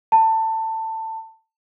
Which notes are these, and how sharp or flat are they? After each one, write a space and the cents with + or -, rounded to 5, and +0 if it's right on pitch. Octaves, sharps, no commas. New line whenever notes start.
A5 +20